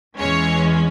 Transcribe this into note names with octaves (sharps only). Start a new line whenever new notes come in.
E2 E3 G#3 C#4 C#5